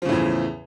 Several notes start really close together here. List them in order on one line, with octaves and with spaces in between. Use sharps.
F3 C#3 A2 E2